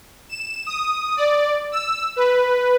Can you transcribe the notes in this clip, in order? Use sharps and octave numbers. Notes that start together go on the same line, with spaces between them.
E7
D#6
D5
E6
B4